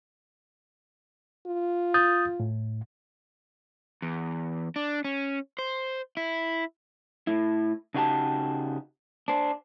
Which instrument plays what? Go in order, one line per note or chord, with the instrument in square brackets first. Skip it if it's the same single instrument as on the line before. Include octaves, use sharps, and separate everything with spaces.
[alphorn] F4
[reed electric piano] D#6 G6 A6
A2
[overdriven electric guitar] E2
D4
C#4
C5
E4
[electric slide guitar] A2 E4
C#3 D#4 F#4 G4 C#5 A5
D4 C5